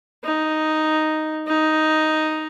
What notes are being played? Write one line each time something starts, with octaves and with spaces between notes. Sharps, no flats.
D#4
D#4